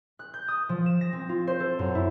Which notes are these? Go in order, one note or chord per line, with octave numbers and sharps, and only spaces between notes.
F#6
G6
D#6
F3
E7
A#6
C4
F4
C5
A4
F#2
E4